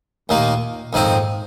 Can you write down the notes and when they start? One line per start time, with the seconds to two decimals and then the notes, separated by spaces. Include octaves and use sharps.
0.29 D#2 A#2 D#3 A#3
0.93 F2 G#2 D#3 C4 D#4